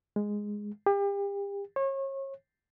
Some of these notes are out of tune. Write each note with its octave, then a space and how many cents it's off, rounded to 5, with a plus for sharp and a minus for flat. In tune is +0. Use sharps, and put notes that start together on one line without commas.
G#3 -5
G4 +35
C#5 -35